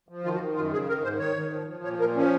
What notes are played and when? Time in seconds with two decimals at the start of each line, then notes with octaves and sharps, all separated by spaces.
0.09 F3
0.24 D#3 F4
0.34 F#4
0.40 D#3
0.55 F#2 F4
0.72 C#3 G#4
0.88 D#3 A#4
1.03 G#2 C5
1.19 D#3 C#5
1.36 D#3
1.52 F3
1.67 F3
1.83 A#2 C#5
1.99 A#2 A#4
2.15 F3 C#4